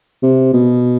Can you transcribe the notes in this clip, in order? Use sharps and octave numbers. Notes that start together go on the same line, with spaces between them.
C3
B2